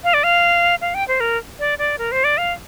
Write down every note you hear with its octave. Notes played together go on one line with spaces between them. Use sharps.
F5
D5
F5
F5
G5
C5
A#4
D5
D5
A#4
C5
D5
F5